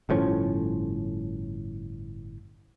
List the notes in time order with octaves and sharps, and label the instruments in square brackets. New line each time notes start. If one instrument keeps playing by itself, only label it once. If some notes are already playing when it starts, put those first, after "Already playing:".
[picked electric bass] G1 A2 F3 C#4